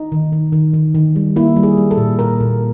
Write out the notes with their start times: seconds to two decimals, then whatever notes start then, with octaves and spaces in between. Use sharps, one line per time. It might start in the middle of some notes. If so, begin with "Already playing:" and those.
Already playing: D#4
0.12 D#3
0.32 D#3
0.53 D#3
0.74 D#3
0.95 D#3
1.16 G3
1.36 A#3 E4
1.56 G3
1.63 G#4
1.77 G3
1.91 A4
1.98 A#2
2.19 A#2 A#4
2.40 A#2